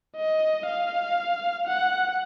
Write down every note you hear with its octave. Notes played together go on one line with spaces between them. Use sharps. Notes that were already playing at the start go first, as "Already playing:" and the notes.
D#5
F5
F#5